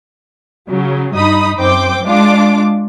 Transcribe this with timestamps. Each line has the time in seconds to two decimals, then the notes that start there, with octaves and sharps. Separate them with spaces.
0.68 C#3 F#3
1.14 G2 D#4 B5 D#6
1.57 F#2 C4 C5 G5 D6 G6
2.03 G#3 D4 F4 D6